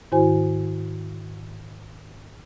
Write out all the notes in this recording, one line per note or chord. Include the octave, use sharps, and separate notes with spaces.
G#2 D#3 E4 F#4 C5 G#5